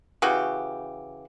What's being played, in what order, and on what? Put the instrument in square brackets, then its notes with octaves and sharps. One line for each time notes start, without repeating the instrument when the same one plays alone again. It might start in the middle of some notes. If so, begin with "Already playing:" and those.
[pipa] C#3 E3 F#4 G4